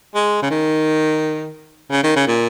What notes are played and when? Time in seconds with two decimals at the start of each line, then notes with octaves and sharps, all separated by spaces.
0.15 G#3
0.42 C#3
0.50 D#3
1.91 C#3
2.03 D#3
2.16 C#3
2.27 A#2